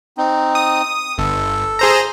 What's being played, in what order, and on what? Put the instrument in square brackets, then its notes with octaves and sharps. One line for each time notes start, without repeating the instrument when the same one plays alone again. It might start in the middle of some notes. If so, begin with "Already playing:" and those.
[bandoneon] C4 D#4
[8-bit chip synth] D#6
[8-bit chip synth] G1 [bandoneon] A4
[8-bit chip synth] G#4 C5 A#5